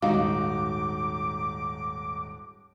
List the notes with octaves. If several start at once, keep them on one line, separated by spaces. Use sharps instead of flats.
D#1 G#2 D#4 F#4 F5 D6